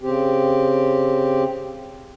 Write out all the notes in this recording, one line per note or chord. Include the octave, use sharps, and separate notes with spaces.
C#3 C4 G4